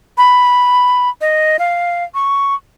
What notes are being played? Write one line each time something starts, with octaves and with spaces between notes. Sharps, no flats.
B5
D#5
F5
C#6